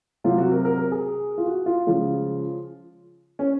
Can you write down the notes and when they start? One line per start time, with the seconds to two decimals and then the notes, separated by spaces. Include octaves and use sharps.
0.24 C3 F#3 F4
0.38 F#4
0.51 A#4
0.65 A#4
0.78 A#4
0.92 G#4
1.38 F4
1.46 F#4
1.66 F4
1.87 C#3 F3 G#3
3.39 C#4